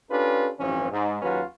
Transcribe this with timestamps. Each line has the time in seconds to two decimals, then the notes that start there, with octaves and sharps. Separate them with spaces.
0.11 C#4 D4 F4 G4 A4 B4
0.59 A1 G2 E3 F3 C4 C#4
0.92 G#2
1.22 D#2 F#3 C#4 F4 F#4 B4